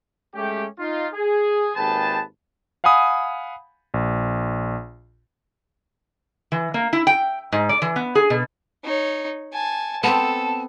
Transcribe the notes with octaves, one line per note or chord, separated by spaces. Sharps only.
G#3 A3 C#4 G4
D#4 F4
G#4
G#1 D#2 G#4 B4 G5 A5
F5 F#5 G#5 B5 D#6
A#1
E3
A#3
E4
G5
G#2
D5
E3
B3
G#4
B2
D#4 C#5
G#5 A5
B3 C4 A4 A5